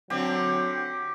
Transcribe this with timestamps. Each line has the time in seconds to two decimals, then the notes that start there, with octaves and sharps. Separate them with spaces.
0.10 D3 F#3 C4 G4